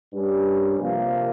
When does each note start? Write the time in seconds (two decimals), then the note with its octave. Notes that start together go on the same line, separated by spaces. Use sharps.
0.12 G2 G3 C#4 G4 A#4
0.79 C3 F3 A#3